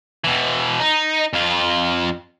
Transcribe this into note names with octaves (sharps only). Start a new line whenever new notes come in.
B2 E3
D#4
F2 F4